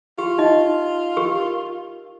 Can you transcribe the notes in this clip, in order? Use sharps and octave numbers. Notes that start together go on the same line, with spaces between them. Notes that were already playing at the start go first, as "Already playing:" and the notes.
F4 G4
D#4 D#5
G4 A#4